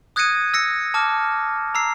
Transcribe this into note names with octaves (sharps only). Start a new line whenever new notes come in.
D#6 F#6 G#6 A#6 C#7 D#7
E6 A#6 C#7
A5 D6 F6
A#5 E6 C7